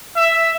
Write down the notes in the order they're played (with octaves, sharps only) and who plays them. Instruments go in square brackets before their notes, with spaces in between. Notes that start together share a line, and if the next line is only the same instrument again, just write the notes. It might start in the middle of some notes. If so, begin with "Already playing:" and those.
[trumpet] E5